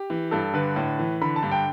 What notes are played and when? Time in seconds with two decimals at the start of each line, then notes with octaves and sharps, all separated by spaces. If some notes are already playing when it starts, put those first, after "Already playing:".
Already playing: G4
0.10 E3
0.31 G2 A4
0.54 D3 B4
0.76 A2
0.99 E3
1.21 D3 B5
1.36 A5
1.43 G2
1.51 G5